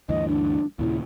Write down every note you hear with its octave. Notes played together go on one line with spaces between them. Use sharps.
D2 G2 E3 D#5
D4
D#2 A#2 C#3 E4